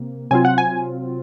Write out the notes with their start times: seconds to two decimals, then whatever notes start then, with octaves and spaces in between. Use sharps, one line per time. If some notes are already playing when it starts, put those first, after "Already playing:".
Already playing: C3 A#3
0.31 C3 F#3 C4 F4 G#5
0.45 F#5
0.58 G#5